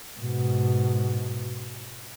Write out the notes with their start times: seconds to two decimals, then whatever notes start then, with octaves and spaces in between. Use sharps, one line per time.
0.20 G#2 B2